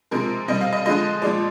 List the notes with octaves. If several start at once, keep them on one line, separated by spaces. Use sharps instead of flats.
C3 F3 G#3 A#4
C3 G3 D#5
F5
D#5
D3 F3 G#3 D#5
A#2 F3 G#3 D5